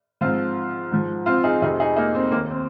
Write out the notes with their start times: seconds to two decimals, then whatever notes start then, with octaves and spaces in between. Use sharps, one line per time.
0.21 G#2 F3 C4 F4
0.91 G#2 F3
1.26 C4 F4
1.44 D#4 G#4
1.62 F2 C3 F3 D#4 G#4
1.80 D#4 G#4
1.96 A#3 D#4
2.15 C4
2.32 D#2 D#3 A#3
2.50 C4